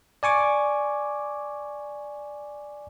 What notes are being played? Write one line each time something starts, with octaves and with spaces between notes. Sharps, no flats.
D5 G#5 C#6 D6